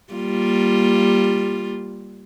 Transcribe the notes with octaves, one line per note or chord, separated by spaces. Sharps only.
G3 A#3 F4